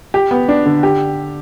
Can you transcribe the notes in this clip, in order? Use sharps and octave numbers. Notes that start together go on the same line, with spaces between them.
G4
B3
D4
D3
G4